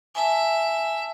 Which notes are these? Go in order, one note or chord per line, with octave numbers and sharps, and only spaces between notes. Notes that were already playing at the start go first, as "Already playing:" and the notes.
E5 G#5 A5